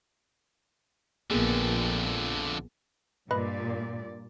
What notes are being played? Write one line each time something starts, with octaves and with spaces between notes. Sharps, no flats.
A#1 F2 D3 A#3 B3 G#4
G2 A#2 B4 D5 D#5 B5